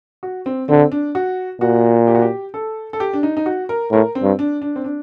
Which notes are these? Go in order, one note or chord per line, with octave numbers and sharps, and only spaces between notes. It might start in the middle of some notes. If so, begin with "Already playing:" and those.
F#4
C4
D3 C4
D4
F#4
A#2 F#4
G4
F#4
G4
A4
A4
G4
D4
D#4
D#4
F#4
A#4
A2 A#4
C4
G2
D4
D4
C4
D4